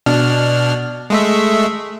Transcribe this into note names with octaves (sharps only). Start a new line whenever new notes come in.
B2 D4 F6
G#3 A3 E5